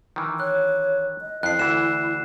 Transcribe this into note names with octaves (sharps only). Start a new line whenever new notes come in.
D#3 E3
C#5 F#6
D#5
F2 E4 F#6 C7
D2 E3 E7